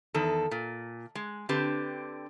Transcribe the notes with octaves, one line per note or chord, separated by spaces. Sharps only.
E2 D#3 A4
A#2
G#3
D3 C4 G4 B4